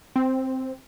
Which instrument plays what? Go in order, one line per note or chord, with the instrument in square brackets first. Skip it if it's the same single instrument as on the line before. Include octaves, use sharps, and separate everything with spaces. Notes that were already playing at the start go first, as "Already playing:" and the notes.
[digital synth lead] C4